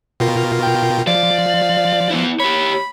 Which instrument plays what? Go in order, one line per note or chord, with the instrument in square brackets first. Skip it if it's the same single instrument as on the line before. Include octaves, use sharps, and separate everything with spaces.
[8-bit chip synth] B2 F4 A#4 [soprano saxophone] G5
[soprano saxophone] G5
[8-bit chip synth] F3 [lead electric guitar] D5 [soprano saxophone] F5
[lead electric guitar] B3 E4
[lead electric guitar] G4 C#5 [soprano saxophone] B5